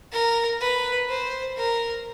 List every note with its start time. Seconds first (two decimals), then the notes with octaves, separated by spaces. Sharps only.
0.12 A#4
0.60 B4
1.09 C5
1.57 A#4